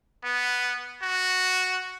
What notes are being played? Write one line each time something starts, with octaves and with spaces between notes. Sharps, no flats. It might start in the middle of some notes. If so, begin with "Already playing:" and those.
B3
F#4